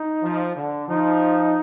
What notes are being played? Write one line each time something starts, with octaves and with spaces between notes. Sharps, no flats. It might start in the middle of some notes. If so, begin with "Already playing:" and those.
Already playing: D#4
F3
D3
F3 D#4